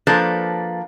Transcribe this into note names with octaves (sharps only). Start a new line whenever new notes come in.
F3 A#3 D4 A4 B4 C5